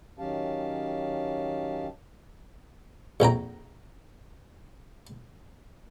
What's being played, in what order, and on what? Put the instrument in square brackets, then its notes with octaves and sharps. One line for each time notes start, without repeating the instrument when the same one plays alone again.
[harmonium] D#3 F#3 C#4 G4 F5 A5
[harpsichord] A#1 F2 G5 A#5